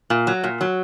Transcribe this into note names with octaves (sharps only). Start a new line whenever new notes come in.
A#2
F#3
A#2
F#3